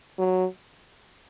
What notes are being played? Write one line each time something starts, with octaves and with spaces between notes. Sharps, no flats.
F#3